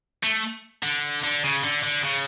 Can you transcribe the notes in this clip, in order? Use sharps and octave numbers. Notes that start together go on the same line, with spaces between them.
A3
D3
D3
C#3
D3
D3
C#3